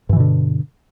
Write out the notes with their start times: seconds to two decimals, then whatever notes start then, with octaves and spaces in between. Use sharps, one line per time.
0.09 G2
0.13 E3
0.16 B2
0.20 D3